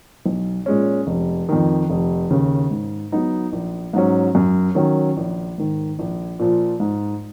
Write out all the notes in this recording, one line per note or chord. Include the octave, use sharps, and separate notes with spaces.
B1
A#2 G#3 C#4
F1
F2 D#3
F1
D#2 C#3
G#2
F#3 B3 D#4
A#1
G#2 F#3 C#4
F#2
D#3 F#3 C#4
A#1
G#2 D#3
A#1
A#2 F3
G#2